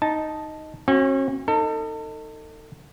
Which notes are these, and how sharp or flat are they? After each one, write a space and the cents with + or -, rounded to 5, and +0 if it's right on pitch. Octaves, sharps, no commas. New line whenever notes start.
D#4 +0 A5 +0
C#4 -40 F#4 +0
D#4 +0 A4 +35